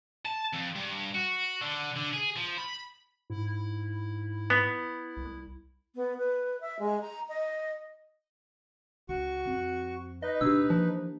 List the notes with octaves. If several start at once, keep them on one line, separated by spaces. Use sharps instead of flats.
A5
F2
G2
F#4
D3
D3
G#4
F3
B5
G#2 E4
B3
C2
B3
B4
E5
G#3
A#5
D#5
C#2 F#4 C#6
F2 C4
D#4 B4 D#5
D2 B2 D4 G4 E6
E3 F3 A#3